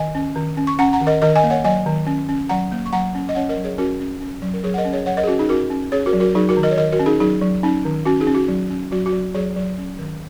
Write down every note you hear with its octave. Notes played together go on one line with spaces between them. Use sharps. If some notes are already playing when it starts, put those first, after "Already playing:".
Already playing: D#3 D#5 G#5
C#4
D#3
C#4
C#6
C#4 F#5 A#5
F#5 A#5
D#3
A#4 D#5
D#3 A#4 D#5
D#5 G#5
A#3
C#5 F#5
F#3 D#5 G#5
D#3
C#4
C#4
F#3 F#5 A#5
A#3
C#6
F#3 F#5 A#5
C#4
D#5
C#4 C#5 F#5
A#4 D#5
F#3
G#4 C#5
C#4 F#4 A#4
C#4
C#4
F#3
A#4
F#3 G#4 C#5
F#5
A#4 D#5
C#4
G#4 C#5
F#3 C#5 F#5
A#4 D#5
G#4
C#4 F#4
D#4 G#4
C#4 F#4 A#4
C#4
C#4 G#4 C#5
F#4 A#4
F#3
F#4 A#4
F#3 D#4 G#4
F#4 A#4
D#3
A#4 D#5
C#5
D#3 A#4 D#5
F#4 A#4
C#4
D#4 G#4
F#3 D#4 G#4
F#3
C#4 D#4
D#3
C#4 F#4
D#4 G#4
C#4
F#4
F#3
C#4
F#3 F#4
F#4
F#3
F#3 G#4 C#5
F#3
C#4
D#3